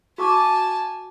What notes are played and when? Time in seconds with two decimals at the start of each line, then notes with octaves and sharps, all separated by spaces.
0.18 F#4 G#5 A5 C#6 D6